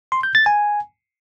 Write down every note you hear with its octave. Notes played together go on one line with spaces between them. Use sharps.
C6
G6
A6
G#5